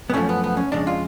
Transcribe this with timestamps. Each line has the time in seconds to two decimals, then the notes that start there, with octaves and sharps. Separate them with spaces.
0.10 B3
0.14 F#2 F3 A3 C#4
0.29 B3
0.44 B3
0.57 C#4
0.72 F2 C#3 G#3 D4
0.87 F4